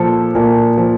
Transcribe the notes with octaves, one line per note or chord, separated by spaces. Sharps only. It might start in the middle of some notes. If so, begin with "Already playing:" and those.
Already playing: A#2 F3 A4
A#2
F3